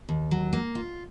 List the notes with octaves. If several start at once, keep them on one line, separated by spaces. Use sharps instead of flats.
D#2
F#3
A#3
F4